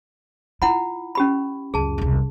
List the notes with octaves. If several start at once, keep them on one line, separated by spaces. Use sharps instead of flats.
E4 F4 F#5 B5
C#4 G4 B5
C#2 F#2 G#4 A5
E1 C2